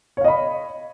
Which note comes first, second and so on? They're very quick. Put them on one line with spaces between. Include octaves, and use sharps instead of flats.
C#5 F5 D#5 B5